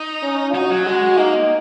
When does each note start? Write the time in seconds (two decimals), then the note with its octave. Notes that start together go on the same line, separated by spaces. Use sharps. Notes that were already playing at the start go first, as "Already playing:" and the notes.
Already playing: D#4
0.23 C#4
0.54 D#4 F#4
0.70 F#3
0.86 G#3 F#4
1.17 A#3 D#4